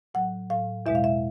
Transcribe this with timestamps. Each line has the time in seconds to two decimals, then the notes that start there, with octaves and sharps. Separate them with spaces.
0.14 A2 F#3 F#5
0.50 A2 F#3 F5
0.86 E2 B2 G#3 E5
0.95 F5
1.04 E5